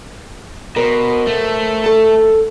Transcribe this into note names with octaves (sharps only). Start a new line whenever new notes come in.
B2 A#4 C5
A3
A4 A5